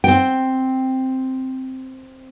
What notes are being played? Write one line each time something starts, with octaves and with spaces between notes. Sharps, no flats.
C4 G5